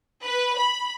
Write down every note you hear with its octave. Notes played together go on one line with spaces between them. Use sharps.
B4
B5